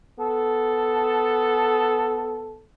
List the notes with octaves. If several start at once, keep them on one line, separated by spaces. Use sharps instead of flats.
B3 A4